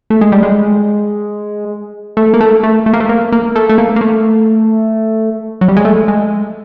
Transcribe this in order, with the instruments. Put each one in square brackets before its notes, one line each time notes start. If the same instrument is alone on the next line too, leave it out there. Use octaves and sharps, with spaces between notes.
[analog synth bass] A3
G#3
G3
G#3
A3
A#3
A3
A3
A3
A#3
A3
A#3
A#3
A3
A3
A#3
A#3
A3
F#3
G3
G#3
A3
G#3